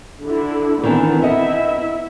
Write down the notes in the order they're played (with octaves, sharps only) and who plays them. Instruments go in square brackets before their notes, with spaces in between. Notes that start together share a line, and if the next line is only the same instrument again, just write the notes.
[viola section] D3 E4
[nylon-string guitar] D#3 E3 D4 [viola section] B3 C4
[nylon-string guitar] B3 D#5 [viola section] E4 E5